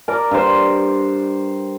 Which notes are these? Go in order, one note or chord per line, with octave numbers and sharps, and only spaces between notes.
A#4 D5 A#5
G2 C5